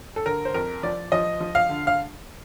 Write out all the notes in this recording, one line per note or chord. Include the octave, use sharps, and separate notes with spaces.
A4
D3 A#4
C5
F2 A#4
F3 D5
F3 D#5
F3
F5
D3
F5